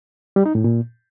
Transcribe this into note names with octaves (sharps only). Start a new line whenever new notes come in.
G3
D#4
A2
A#2